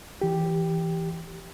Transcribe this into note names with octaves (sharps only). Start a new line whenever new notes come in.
E3 G4